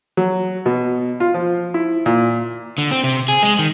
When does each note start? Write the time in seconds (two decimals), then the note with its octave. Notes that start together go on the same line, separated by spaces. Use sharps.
0.17 F#3
0.66 B2
1.20 F4
1.34 F3
1.74 E4
2.06 A#2
2.78 D3
2.91 C4
3.04 C3
3.28 G#4
3.43 G#3
3.59 D#3